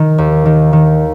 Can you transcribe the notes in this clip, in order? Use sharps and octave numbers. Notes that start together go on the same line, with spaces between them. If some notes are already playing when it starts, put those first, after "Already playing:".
Already playing: D#3
D#2
D#3
D#3